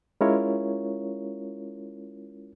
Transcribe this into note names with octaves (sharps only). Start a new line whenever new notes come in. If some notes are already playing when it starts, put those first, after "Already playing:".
G#3 C#4 E4 F4 A#4 C#5